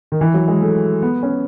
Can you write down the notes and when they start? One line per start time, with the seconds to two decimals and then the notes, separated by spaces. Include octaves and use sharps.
0.12 D#3
0.21 E3
0.34 F#3
0.48 G#3
0.61 A3
1.02 B3
1.23 C#4